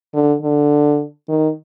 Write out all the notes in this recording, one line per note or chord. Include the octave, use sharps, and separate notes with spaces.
D3
D3
D#3